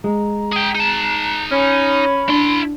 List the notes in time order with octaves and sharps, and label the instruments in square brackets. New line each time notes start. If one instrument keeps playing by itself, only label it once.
[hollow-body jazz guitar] G#3 [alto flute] A#5
[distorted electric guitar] G#4 G5
D#4 A5
[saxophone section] C#4 [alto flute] B5
[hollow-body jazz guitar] D4 [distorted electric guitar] E4 C6